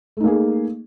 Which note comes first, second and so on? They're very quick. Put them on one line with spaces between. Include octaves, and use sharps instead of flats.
A3 D#4 A#3 G#4